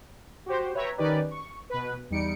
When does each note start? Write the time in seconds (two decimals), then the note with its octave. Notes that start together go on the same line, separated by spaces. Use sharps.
0.46 F#4 G4 C5
0.74 B4 C#5 E5 G5 A#5
0.98 D#3 C#4 D#4 G4 B4 D5
1.31 C#6
1.70 B2 B4
2.10 E2 G3 D#4 C#7 D7